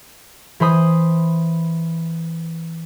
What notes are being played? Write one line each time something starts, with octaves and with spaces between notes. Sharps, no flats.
E3 C5 B5 D#6